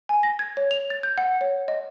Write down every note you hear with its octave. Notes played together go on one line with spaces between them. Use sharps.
G#5
A#6
G#6
C#5
F7
A6
G6
F#5
C#5
D#5